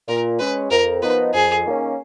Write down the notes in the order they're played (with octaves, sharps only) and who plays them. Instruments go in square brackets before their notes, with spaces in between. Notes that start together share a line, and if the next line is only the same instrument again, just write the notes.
[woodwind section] A#2 [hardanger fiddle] A#4
[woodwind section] G#3 C#4 [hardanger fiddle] B4
[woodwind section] F2 [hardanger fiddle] A#4
[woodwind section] F3 B3 D#4 [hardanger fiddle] B4
[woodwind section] F2 [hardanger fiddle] G#4
[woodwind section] D#3 A#3 C#4